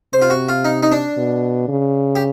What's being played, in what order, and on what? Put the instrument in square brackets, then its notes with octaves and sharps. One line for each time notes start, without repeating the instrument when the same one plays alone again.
[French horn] C3 [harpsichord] C5
[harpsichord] F4
F#4
F4
D#4
D#4
D4
[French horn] B2
C#3
[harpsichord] G4